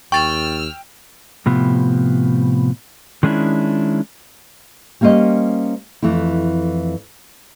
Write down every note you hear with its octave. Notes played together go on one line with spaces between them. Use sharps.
D#2 G5 C#6 E6 F6 A6
A2 C3 F3 B3
D#3 G#3 C#4 D4 E4
G3 A#3 C#4 C5 D#5
F2 E3 A3 E4